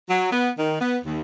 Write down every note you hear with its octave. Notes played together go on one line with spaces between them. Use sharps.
F#3
B3
D#3
B3
D#2